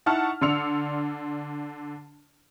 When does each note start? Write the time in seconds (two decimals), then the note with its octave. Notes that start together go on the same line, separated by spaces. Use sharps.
0.06 D#4 E4 F#5 A5 C#6 F6
0.41 D3 D5 C6 E6 C#7 F7